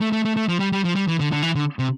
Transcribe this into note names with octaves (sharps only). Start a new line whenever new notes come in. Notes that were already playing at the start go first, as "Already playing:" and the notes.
A3
A3
A3
A3
F3
G3
G3
F3
G3
E3
D3
D3
E3
D3
C3